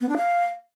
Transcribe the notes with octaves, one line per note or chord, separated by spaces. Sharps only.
B3
D4
F5